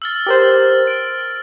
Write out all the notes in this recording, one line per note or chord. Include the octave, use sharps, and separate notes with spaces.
E6 F6 A6
G4 A#4 C5
D7